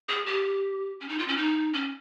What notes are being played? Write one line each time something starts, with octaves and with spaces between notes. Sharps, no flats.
G#4
G4
C#4
D#4
F4
C#4
D#4
C#4